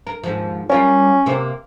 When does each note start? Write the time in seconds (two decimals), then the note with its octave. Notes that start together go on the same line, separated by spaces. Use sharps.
0.07 A#4
0.23 D#2 G#2 F3
0.69 G3 C#4 F4 A#4
1.26 C3 A#3 C5